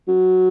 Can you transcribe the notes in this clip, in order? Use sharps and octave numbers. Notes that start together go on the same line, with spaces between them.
F#3